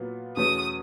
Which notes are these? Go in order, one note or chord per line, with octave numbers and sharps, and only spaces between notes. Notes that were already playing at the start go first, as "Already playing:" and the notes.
Already playing: A#2 F#3 B3
E2 B2 F#3 A3 C#4 D#6